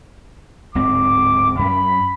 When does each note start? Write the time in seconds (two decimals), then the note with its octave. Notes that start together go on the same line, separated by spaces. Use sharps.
0.75 D1 G#2 C4 D6
1.59 F#2 C#4 B5